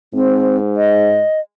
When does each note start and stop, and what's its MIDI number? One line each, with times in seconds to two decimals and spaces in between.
0.14 1.22 44
0.14 0.57 60
0.77 1.40 75